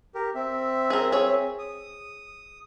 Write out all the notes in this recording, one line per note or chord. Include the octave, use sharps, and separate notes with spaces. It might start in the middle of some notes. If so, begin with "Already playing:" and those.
G4 A#4
C4 E5
G#4 A#4
G#4 C#5
D#6